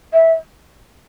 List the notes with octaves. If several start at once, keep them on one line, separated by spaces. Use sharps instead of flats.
E5